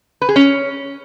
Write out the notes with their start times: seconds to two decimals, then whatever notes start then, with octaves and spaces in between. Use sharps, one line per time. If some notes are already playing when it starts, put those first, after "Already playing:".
0.22 B4
0.29 G#4
0.36 C#4